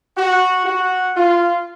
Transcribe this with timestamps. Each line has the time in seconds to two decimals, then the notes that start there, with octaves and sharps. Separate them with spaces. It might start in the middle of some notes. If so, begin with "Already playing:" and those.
0.17 F#4
0.65 F#4
1.15 F4